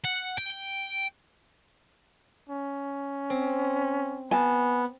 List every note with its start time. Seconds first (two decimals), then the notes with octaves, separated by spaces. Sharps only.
0.05 F#5
0.38 G5
2.49 C#4
3.30 C4
4.31 B3 G#5 A5